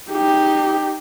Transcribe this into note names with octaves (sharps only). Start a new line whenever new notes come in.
D#4 G4